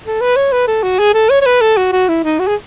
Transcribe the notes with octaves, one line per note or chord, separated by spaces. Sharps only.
A4
B4
C#5
B4
A4
F#4
G#4
A4
C#5
C#5
B4
A4
F#4
F#4
E4
D#4
F#4
G#4